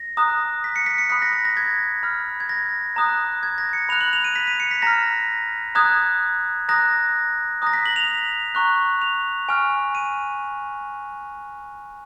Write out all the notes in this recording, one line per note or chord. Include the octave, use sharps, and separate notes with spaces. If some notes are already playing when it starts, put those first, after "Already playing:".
Already playing: A#6
A#5 D#6 F#6
B6
C#7
B6
C#7
B5 D#6 F#6 B6
A#6
A#6
A#6
G#6
B5 F6
G#6
A#6
A#5 D#6 F#6
G#6
A#6
C#7
B5 F#6 F7
F#7
F7
D#7
B6
D#7
C#7
B6
A#5 F6 A#6
A#5 D#6 F#6 G#6
A#5 D#6 F#6 A#6
A#5 D#6 F#6 A#6
B6
F#7
F7
A#5 C#6 F#6
F7
G#5 C#6 F6
D#7